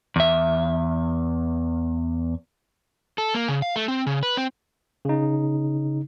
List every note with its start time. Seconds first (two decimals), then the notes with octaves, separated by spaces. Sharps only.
0.16 E2 E5
3.18 A4
3.34 A#3
3.48 C#3
3.62 F5
3.76 A3
3.88 C4
4.06 C#3
4.23 B4
4.37 C4
5.05 C#3 D#4